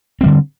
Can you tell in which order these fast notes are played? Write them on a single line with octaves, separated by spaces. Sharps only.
C4 G3 D3